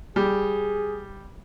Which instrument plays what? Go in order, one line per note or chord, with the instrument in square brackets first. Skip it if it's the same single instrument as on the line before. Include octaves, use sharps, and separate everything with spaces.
[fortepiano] G3 [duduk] G#4